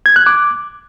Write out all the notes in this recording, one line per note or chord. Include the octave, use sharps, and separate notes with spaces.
G#6
F#6
D6